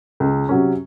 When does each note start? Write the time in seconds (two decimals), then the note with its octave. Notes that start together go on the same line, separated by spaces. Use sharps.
0.20 C#2
0.49 C3 F#3 C#4